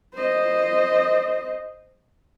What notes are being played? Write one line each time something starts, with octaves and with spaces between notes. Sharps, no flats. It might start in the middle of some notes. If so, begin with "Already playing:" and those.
C5 D#5